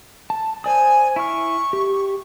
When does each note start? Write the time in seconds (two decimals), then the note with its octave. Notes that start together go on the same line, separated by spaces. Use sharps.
0.30 A5
0.64 C5 D5 G#5 D#6
1.16 E4 C#6 F6
1.73 G4